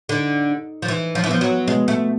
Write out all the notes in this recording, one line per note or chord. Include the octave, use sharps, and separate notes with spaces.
D3 D#4
D#4
F3
E3 D#4
F3
E3
F3 B3
F#3
B2 G#3
A3